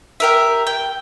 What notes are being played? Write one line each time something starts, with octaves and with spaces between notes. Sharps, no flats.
G4 A#4 E5
G5